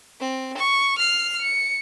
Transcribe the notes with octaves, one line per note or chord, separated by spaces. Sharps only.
C4
C#6
F6 C7
C#7